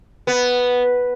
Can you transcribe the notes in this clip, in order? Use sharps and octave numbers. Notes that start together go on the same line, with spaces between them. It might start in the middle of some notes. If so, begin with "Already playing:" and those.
B3